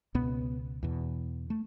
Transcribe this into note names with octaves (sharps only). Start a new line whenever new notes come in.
C#2 B2 B3
E2 B2
A3